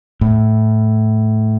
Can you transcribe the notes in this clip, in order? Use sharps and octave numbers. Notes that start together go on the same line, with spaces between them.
A2